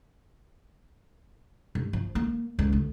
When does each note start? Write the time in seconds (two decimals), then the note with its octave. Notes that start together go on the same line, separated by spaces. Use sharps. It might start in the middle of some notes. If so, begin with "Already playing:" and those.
1.75 G2
1.93 F3
2.15 A#3
2.59 C#2
2.73 D2